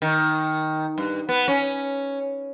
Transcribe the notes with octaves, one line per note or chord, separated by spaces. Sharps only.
D#3
G2
B3
C#4